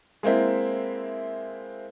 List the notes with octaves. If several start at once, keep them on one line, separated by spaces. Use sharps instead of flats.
G#3 A#3 C4 E4